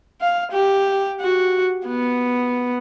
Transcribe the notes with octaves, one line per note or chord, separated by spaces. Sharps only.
F5
G4
F#4
B3